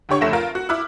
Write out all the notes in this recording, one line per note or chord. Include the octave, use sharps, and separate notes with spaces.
D2 D3 G4 C#5 C#6
F1 C#2 A3 A#6 E7
F4 A#4
F#4
E4 D6 F6 F#6